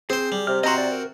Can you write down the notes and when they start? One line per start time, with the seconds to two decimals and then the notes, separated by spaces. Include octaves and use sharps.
0.10 C4 G#4 C5
0.32 G3
0.47 C3 F6
0.64 C4 F#4 D#5 A#5 C6
0.78 D5
0.92 A#4